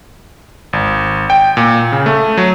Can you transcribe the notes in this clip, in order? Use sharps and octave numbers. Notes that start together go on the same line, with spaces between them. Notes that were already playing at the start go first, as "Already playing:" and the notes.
G#1
G5
A#2
C#3
A3
F#3